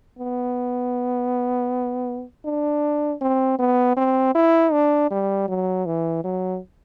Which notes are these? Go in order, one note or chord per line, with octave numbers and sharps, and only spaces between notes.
B3
D4
C4
B3
C4
E4
D4
G3
F#3
E3
F#3